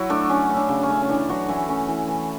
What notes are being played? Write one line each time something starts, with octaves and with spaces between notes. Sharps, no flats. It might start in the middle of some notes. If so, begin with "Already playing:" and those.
Already playing: F#3 E4 F#4
A3 D4
F#3 C#4
A3
D4
C#3
C#4
A3
C#4
E3 D4
E3 F#3 F#4
E3 C#4 E4
A3 C#4
E3
E3